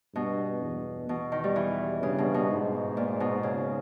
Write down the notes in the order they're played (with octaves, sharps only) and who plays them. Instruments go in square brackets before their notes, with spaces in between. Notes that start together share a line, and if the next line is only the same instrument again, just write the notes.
[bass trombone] G2 [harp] B2
[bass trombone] E2
[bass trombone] E2 [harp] B2
[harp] D#3
G3
E3
[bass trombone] G2 [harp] C#3
[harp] B2
B2
[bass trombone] G#2
[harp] A#2
B2
C#3